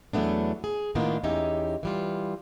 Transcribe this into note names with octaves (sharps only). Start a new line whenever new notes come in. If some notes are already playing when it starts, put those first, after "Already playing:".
E2 F#3 A3 B3 D4
G#4
A2 D#3 A#3 B3 D4 F4
E2 C#4 D#4 G4 E5
E3 G3 F4